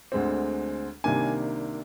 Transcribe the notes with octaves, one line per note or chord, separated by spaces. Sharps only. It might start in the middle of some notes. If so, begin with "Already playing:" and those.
D2 D3 G#3 C4
C2 C3 D#3 A#3 D4 G#5